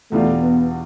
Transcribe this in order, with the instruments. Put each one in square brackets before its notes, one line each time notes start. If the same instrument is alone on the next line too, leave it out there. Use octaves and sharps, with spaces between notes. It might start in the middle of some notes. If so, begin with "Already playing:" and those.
[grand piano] E2 B2 G3 D4 F4 [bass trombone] A3
[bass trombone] B3